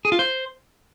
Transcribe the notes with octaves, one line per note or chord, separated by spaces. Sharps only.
G#4
F4
C5